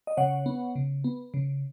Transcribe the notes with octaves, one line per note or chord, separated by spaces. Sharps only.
D#5
C#3 C#5 F#5
B3
C#3
B3
C#3